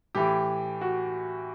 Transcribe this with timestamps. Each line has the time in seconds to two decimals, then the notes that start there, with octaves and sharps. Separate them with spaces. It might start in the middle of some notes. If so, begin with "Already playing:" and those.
0.15 A2 E3 G4
0.81 F#4